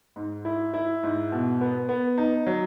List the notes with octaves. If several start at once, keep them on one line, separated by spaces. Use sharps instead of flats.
G#2
E4
E4
G#2
B2
B3
B3
D#4
F#3